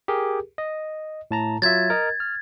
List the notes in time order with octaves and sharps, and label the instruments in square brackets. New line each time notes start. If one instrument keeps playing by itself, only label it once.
[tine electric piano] G4 G#4 A#4
D#5
A2 A5 A#5
[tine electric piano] F#3 F4 E5 [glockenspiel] G#6 A6
[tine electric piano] A#4 D#5
F6